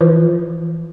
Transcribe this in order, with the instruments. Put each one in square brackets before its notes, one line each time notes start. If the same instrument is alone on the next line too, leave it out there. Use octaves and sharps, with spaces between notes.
[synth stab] E3 F3